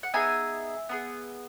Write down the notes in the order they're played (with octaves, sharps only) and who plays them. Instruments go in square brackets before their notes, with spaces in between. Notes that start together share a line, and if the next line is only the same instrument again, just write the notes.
[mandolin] F#5
B3 D#4 G#4 E5 G#5
B3 D#4 G#4